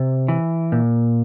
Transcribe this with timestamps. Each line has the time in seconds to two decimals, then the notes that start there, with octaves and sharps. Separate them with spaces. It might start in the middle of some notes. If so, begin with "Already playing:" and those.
Already playing: C3
0.28 E3
0.72 A#2